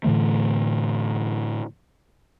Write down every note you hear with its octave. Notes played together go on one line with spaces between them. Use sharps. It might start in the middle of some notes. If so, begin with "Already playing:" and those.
A2 D3 E3 A3